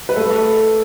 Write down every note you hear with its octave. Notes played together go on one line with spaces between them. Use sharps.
B4
A3 A4